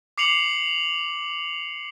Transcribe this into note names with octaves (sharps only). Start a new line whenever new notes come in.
D6 C7 C#7 F7 F#7